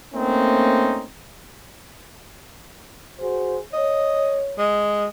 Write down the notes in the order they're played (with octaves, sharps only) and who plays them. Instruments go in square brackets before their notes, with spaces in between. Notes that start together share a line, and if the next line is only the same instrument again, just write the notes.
[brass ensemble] A3 A#3 C4 C#4 D#4
[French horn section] F#4 G#4 C5
[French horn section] C#5 [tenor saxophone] D#5
[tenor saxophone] G#3